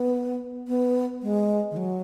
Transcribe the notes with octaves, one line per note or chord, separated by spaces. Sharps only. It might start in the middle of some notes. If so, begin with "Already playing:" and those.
Already playing: B3
B3
G#3
D#3
F#3